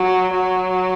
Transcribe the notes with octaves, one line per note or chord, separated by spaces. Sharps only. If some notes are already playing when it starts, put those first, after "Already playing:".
Already playing: F#3
F#3